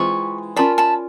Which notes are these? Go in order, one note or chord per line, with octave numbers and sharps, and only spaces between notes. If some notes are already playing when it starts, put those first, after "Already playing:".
Already playing: E3 G#3 C4 F4 B5 C#6
C#4 F4 A#4 D5 A5 B5
A5 B5